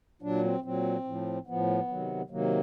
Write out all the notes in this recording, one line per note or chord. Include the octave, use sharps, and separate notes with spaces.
A#2 F#3 D4
C4
A#2 F#3 C4
A2 F3
A2 F3 B3
C3 D#3 F#3
C3 D#3 F#3 A#3